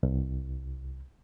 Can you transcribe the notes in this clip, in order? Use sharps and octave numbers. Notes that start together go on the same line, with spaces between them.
C2